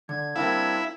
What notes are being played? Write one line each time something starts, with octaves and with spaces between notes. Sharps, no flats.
D3 G#6
G3 C4 D4 E4 A#4 F5